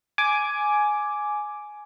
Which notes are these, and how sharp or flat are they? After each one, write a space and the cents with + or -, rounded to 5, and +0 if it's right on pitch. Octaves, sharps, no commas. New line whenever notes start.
G#5 +10 D6 +0